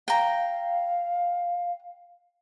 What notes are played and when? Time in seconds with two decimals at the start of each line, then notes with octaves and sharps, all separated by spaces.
0.08 F5 G5 A#5